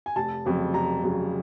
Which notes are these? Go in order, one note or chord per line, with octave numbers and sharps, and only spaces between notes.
G#5
F1 A5
F2 C#3 F#3
F1 A#5
F2 C#3 F#3